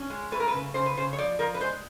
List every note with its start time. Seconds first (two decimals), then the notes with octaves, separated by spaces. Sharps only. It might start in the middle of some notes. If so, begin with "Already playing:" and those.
Already playing: C#4
0.10 G#3
0.32 A3 B4
0.40 A#4
0.48 B4
0.53 C#3
0.74 C#3 C5
0.86 B4
0.97 C#3 C5
1.13 C#5
1.18 F3 D5
1.39 F3 A#4
1.54 B4
1.60 G#3 C5